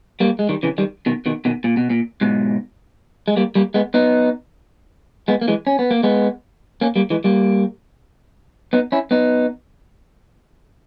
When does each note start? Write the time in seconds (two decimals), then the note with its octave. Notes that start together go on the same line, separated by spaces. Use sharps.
0.20 G3 A#3
0.39 G#3
0.49 D#3 G3
0.63 C#3 E3
0.78 D#3 G3
1.06 B2 D#3
1.26 B2 D#3
1.45 B2 D#3
1.64 A#2
1.77 B2
1.90 A#2
2.21 G#2 B2
3.28 G#3
3.37 G3 A#3
3.55 G3 A#3
3.74 G#3 B3
3.94 B3 D#4
5.28 G#3 B3
5.41 A#3
5.48 E3 G#3
5.67 C#4
5.79 B3
5.91 A#3
6.03 G#3 B3
6.81 A#3 C#4
6.96 G3 A#3
7.10 E3 G#3
7.24 G3 A#3
8.73 B3 D#4
8.92 C#4 E4
9.11 B3 D#4